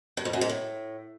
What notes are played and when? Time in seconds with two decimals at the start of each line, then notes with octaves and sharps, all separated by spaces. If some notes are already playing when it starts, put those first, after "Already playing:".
0.17 G2
0.25 F2
0.33 F#2
0.41 G#2
0.49 A2